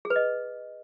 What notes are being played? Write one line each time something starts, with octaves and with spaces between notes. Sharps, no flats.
G#4
B4
D#5